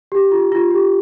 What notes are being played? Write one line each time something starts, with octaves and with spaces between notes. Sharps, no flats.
G4
F4
F4
G4